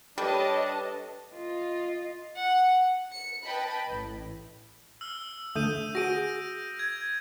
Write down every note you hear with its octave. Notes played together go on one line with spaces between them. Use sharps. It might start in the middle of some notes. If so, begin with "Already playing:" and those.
G3 D4 G4 A4 B4 C#5 D#5 A5
F4 D#5
F#5
C#7
B4 D#5 G5 A5 B5
A1 A2
E6 F6
D3 A3 D#6 G6 D#7
F#4 G#4 A#6 D7 D#7
G#6